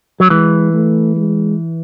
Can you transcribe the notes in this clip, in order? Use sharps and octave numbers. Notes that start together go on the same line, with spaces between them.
F#3
E3 G#3
A3
G#3